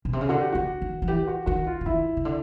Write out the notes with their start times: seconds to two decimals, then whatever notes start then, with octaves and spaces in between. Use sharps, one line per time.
0.05 B2
0.13 C3
0.21 C#3
0.29 D3 F#4
0.41 G4
0.52 D3 F#4
0.82 D#3
1.02 F3
1.07 E3 G4
1.28 F#4
1.46 D#3 F#4
1.67 F4
1.81 D3
1.86 D#3 E4
2.17 C#3
2.25 D3